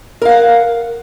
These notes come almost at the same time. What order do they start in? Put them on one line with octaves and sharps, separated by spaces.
A#4 F5 F#5